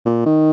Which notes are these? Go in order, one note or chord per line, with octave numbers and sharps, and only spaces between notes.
A#2
D#3